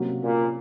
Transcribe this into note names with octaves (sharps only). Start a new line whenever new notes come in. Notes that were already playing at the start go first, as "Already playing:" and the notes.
Already playing: C3 F#3 A#3 C#4 F#4
A#2